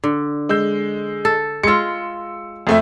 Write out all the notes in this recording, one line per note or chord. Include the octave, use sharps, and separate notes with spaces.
D3
G#3 E6 G6
A4
G#3 F4 E6 C#7
F2 A3 E5